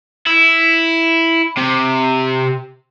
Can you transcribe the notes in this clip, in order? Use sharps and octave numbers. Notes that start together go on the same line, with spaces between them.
E4
C3